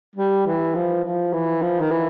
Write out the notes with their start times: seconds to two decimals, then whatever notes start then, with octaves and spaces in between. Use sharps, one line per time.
0.16 G3
0.46 E3
0.75 F3
1.04 F3
1.33 E3
1.62 F3
1.80 D#3
1.91 E3